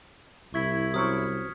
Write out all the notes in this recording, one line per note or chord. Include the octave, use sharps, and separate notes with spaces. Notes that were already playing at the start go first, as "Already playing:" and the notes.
C2 E4 C#6 G#6 B6
F#3 C4 C#4 D#6 F6 C#7